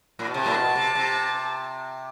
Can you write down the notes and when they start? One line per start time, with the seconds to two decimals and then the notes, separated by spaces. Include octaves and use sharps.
0.19 A2
0.27 B2
0.34 C3 A5
0.46 A2
0.54 B2
0.75 C3
0.95 C3